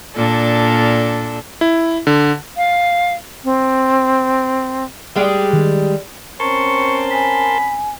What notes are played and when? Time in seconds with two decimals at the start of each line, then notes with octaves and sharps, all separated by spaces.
0.16 A#2 D4 A4
1.61 E4
2.07 D3
2.57 F5
3.44 C4
5.16 G3 G#3 G4
5.53 D#3
6.40 C4 C#4 A#4 A5 C6 C#6
7.11 G#5 B5